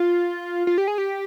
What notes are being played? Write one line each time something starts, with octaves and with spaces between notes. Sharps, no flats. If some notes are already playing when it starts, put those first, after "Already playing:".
Already playing: F4
F4
G4
G#4
G4